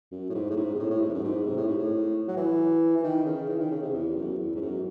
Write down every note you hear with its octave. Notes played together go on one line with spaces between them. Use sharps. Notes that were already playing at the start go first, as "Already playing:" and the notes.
F#2
A2
G#2
A2
G#2
C3
A2
A2
G#2
E2
F#2
G#2
C3
A2
G#2
A2
F#3
E3
E3
D#3
C#3
E3
D#3
C#3
C3
E2
F#2
E2
G#2
F#2